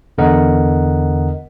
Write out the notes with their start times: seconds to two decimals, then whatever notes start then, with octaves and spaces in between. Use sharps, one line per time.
0.18 E2 D3 A#4 D#5 F#5